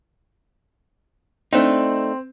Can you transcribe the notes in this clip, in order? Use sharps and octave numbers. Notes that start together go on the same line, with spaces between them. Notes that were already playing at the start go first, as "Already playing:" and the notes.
A3 C4 D4 D#4